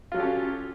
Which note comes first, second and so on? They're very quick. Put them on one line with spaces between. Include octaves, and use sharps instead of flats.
F4 F#3 A4 G4 C#4